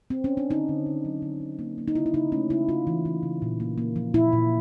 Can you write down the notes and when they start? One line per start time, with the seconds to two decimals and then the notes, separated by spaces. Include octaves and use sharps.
0.10 C4
0.24 C#4
0.37 D4
0.50 D3 D#4
0.69 D3
0.86 D3
1.05 F#3
1.22 D3
1.41 D3
1.59 A#3
1.78 A#3
1.88 D#4
1.95 C#3 E4
2.06 E4
2.14 C#3 D#4
2.32 A3 C#4
2.50 C#3 E4
2.69 C#3 F4
2.87 E3
3.05 E3
3.23 C#3
3.42 A#2
3.60 A#3
3.78 A#3
3.96 F3
4.14 A#2 E4
4.33 A#2